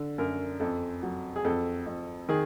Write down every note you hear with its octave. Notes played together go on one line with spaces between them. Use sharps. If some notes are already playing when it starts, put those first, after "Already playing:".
Already playing: D3 A4
F#2 A#4
F2 A4
F#3
G#4
F2 A4
F2
D#3 G#4